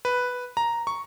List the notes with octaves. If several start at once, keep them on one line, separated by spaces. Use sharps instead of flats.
B4
A#5
C#6